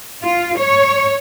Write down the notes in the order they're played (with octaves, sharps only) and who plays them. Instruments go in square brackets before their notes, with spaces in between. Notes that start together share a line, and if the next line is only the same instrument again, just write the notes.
[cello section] F4
C#5